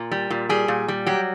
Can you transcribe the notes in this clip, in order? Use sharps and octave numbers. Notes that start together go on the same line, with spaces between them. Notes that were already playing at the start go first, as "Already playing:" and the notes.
Already playing: A#2
G3
A#2
G3 G#4
A#2
G3
F#3 G4